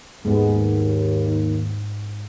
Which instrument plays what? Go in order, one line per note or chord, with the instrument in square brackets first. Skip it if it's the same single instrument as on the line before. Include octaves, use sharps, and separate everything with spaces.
[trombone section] D#2 [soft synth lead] G#2 [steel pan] G#3 B3